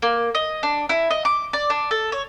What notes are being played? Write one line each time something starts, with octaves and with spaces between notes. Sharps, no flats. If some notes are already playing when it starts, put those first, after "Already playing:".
A#3
D#5
D4
E4
D#5
D6
D5
D4
A4
C#5